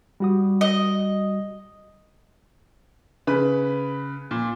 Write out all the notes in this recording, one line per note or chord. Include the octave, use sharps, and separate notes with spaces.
G3 F#4 D#6
D#5
C#3 B4 B5
A#2